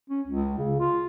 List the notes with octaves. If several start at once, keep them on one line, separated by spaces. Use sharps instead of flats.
C#4
C#2
C#3
F4